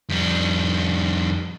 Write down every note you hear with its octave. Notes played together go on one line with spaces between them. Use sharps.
F2 G3